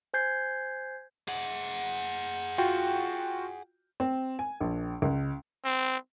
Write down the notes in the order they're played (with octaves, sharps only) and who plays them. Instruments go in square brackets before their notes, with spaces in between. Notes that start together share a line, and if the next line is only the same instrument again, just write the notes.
[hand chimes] C5 G#5 G6 G#6 C7
[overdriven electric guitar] G#4 F#5
[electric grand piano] F4 F#4 G5
[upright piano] C4
G#5
A#1
C#2
[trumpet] C4